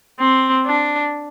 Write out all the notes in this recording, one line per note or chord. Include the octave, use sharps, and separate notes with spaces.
C4
D4